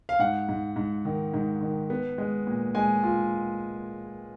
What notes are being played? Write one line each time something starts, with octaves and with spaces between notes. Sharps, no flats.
F5
G#2 F#5
G#2
G#2
D#3
G#2
D#3
B3
G#3
A#2
G#3 G#5
F4